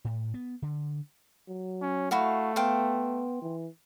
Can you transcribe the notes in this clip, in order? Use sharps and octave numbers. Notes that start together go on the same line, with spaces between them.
A2
B3
D3
F#3
C#4
A3 E4 F#4 F5
B3 C5 F5 G5
E3